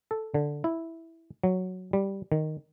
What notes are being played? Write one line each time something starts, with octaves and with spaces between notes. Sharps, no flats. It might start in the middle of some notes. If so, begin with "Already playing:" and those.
A4
D3
E4
F#3
G3
D#3